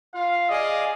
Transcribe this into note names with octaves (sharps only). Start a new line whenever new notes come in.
F4 F5
G#4 D5 D#5 F5 G#5